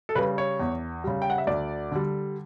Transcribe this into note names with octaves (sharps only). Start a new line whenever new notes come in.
A4
C#3 G3 B4
C#5
E2
C#3 G3
G5
F#5
E5
D2 D5
D3 G3